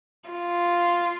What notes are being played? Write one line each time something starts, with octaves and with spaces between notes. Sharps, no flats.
F4